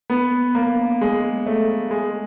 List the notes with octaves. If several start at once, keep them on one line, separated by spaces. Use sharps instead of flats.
B3
A#3
G#3
A3
G#3